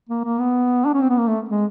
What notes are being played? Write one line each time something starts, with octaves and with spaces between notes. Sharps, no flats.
A#3
A#3
B3
D4
C#4
C4
B3
A#3
A3
G#3